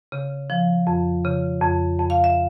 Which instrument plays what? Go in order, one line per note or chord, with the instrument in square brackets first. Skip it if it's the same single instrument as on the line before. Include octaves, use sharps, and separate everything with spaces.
[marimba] C#3
F3
F2
C#3
F2
F2
F5
E5